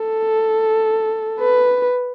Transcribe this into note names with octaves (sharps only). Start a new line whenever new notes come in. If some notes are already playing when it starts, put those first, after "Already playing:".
Already playing: A4
B4